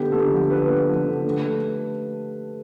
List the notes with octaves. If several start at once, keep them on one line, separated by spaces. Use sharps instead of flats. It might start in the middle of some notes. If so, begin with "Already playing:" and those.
Already playing: D3 B3 G4
D3 A4
F3
D3 B4
B3
F3
D3
A3
A3